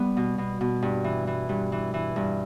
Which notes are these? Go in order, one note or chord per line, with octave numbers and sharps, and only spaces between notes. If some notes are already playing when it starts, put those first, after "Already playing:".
Already playing: G3 B3
B2
B2
B2
G2
E3
E3
G2
E3
E3
G2